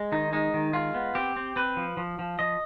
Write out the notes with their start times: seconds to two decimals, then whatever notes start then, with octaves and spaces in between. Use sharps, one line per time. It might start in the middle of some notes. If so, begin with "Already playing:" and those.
Already playing: G#3
0.12 D#3 D#4
0.33 G#3 D#4
0.54 D#3
0.73 G#3 F4
0.94 B3
1.15 C4 G4
1.36 C4
1.56 C4 B4
1.77 F3
1.97 F3
2.19 F3
2.39 F3 D#5